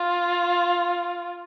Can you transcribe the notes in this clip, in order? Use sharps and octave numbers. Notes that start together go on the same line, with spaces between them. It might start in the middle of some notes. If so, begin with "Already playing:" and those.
Already playing: F4